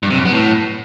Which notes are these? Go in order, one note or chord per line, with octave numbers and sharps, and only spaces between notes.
G2
C3
F#2
B3
A2